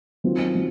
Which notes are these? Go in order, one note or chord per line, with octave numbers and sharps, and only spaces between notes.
D#3 F#3 C4 F4
F#3